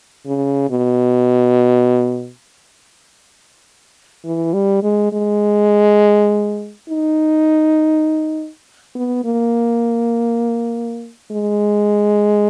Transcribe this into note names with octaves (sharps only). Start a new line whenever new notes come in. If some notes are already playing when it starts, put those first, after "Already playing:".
C#3
B2
E3
G3
G#3
G#3
D#4
B3
A#3
G#3